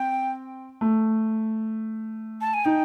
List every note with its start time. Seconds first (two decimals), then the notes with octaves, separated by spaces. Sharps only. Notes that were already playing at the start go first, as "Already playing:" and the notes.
Already playing: C4 G5
0.81 A3
2.41 A5
2.54 G#5
2.65 D#4 G5